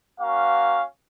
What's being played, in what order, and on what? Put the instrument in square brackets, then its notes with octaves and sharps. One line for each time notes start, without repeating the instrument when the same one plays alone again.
[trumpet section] A#3 C#4 F#4 F5